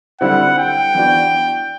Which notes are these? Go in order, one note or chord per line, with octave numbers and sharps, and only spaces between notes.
D3 G3 C4 E4 F#5
G5
E3 B3 D4 F#4